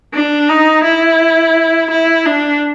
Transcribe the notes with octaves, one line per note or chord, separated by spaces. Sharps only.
D4
D#4
E4
E4
D4